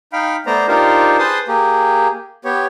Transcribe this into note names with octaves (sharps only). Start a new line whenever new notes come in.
D#4 F5 G5 B5
A3 B3 C5 D5 A#5
D4 D#4 F4 G4 A#4 C5
G#4 B4 C5 A5 C6 D#6
A#3 G4 G#4
B3 G4 C#5